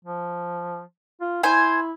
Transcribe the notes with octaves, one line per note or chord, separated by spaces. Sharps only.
F3
F4
E4 C5 G#5